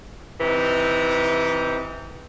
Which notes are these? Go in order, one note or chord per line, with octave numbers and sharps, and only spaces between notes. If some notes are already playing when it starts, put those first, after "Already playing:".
C3 E3 D#4